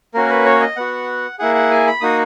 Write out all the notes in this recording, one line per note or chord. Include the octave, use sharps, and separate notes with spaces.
A#3 C#4 F#4 A#4
B4
C#5
D#5
B3 F#4 F#5
A#3 E4 G#4 F#5
F#5
G#5
B5
A#3 D#4 F#4 D#6